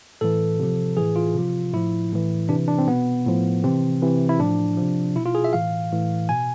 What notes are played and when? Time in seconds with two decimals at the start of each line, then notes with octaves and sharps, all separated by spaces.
0.21 A2 E3 A4
0.60 C3 F3
0.97 A2 E3 G#4
1.16 F4
1.35 C3 F3
1.73 A2 F3 E4
2.12 A2 E3
2.49 C3 E3 D4
2.68 D4
2.78 C4
2.87 B2 B3
3.26 A2 F3
3.64 C3 E3 C4
4.02 C3 E3
4.29 E4
4.39 A2 F3 D4
4.77 C3 F3
5.16 B2 E4
5.26 F4
5.35 G#4
5.44 E5
5.53 A2 E3 F5
5.92 A2 E3
6.29 B2 G#5